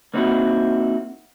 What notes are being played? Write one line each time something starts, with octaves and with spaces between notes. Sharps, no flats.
A#3 C4 D#4 E4 F#4